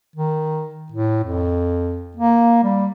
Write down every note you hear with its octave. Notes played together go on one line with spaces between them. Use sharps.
D#3
A2
F2
A#3
G3